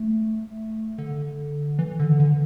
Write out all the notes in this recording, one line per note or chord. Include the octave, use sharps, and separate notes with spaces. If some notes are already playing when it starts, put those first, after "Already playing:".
Already playing: A3
D3
E3
D3
D3